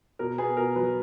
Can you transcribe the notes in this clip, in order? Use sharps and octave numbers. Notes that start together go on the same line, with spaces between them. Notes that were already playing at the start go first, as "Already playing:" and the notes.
B2 A#4
B3 G#4
B2 A#4
F#3 B4